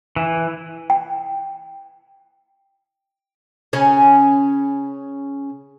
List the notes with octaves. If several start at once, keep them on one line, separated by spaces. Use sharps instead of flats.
E3
G5
C#3 C#4